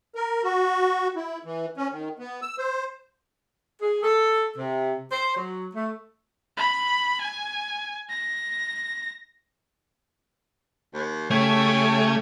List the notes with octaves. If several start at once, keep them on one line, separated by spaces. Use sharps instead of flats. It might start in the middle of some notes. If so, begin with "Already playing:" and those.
A#4
F#4
E4
E3
C#4
D#3
B3
E6
C5
G#4
A4
C3
C5
F#3
A3
B5
G#5
A#6
D#2
C#3 A3 G4 C#5 G#5